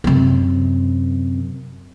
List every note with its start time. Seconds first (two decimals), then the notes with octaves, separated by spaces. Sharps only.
0.04 F#2 C3